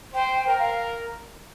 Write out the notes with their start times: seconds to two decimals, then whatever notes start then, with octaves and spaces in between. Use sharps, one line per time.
0.14 C5 G5
0.47 A#4 G5
0.59 F5